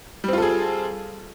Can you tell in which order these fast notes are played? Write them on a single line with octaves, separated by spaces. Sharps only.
G3 C4 F4 A4 G#4